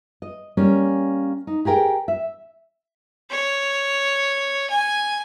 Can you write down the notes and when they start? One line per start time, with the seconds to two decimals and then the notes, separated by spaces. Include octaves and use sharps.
0.22 D#5
0.57 G3 A#3 C#4
1.47 D#4
1.65 G4 G#4 A#4 G5
2.08 E5
3.31 C#5
4.70 G#5